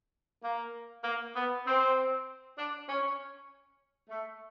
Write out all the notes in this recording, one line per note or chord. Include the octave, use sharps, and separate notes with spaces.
A#3
A#3
B3
C4
D4
C#4
A3